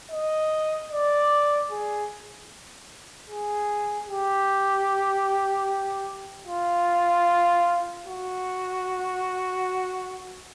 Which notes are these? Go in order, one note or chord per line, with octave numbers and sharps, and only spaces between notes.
D#5
D5
G#4
G#4
G4
F4
F#4